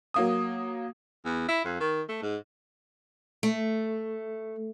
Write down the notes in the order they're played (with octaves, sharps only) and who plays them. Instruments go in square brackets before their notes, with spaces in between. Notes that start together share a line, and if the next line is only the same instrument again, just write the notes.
[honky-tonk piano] F#3 A#3 D#6
[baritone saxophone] E2
E4
F2
D#3
A3
G#2
[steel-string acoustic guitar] A3